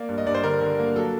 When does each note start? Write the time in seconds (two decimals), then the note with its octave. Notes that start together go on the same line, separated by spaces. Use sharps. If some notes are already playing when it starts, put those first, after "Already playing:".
Already playing: A#3 D5
0.09 G2
0.18 D#5
0.26 G2 D5
0.35 C5
0.44 D3 A#4
0.61 D3
0.79 A#3
0.96 F#3 A4